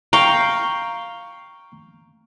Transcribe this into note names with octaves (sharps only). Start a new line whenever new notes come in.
F5 G5 A#5 C#6